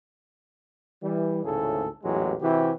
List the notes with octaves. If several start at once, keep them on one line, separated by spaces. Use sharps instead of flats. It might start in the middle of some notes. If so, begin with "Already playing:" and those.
E3 G3
G#1 D2 A2 C#3 G#4 A4
A1 E2 A#2 F#3 G#3 G4
C3 E3 E4 F#4 G4